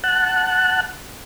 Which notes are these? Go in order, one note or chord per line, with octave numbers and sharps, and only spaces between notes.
F#5 A5 F#6